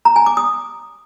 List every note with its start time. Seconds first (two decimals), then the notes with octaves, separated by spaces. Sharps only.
0.05 A#5
0.16 G#5
0.26 D6
0.37 D#6